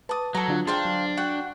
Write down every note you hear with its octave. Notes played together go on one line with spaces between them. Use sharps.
B4 A5 D6 D#6 A6
F#3 A4 A#5
D3 D4 F4
D4 G#4 C5 F5 G5
F#3
F#4 F#5 G5